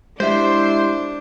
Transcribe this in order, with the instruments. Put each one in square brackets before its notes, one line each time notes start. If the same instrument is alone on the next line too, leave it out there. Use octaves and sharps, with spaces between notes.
[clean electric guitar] G#3 G4 E5 [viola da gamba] D4 [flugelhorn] E4 [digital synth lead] C5